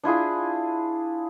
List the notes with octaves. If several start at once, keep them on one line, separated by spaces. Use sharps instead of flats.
D4 E4 F4 G#4